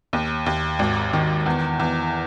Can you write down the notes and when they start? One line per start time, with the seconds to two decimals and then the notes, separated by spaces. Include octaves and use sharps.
0.13 D#2
0.46 D#2
0.79 G#1
1.13 D#3
1.46 E2
1.80 E2